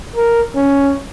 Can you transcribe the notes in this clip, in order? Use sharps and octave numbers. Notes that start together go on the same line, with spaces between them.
A#4
C#4